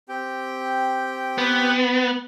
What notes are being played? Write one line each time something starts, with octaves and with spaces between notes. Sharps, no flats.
C4 G4 G5
B3